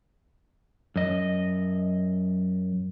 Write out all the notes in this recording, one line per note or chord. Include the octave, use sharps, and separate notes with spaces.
F#2 D#5